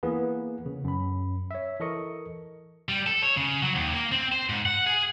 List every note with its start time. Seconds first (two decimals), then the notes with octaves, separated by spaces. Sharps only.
0.03 E3 A#3 B3 G#4 B4
0.66 C#3
0.84 F#2 B5
1.51 C#5 E5
1.80 E3 A4 A#4 D#5 C#6 C#7
2.89 G3
3.07 A4
3.23 C#5
3.37 C#3
3.62 F#3
3.76 D#2
3.94 A#3
4.12 C4
4.32 C5
4.49 G#2
4.66 F#5
4.86 G#4